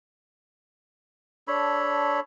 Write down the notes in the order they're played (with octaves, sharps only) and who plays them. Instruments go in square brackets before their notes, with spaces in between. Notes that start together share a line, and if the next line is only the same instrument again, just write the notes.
[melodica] D4 A4 C#5 B5